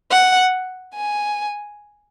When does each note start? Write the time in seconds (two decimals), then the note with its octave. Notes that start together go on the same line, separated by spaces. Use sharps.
0.11 F#5
0.94 G#5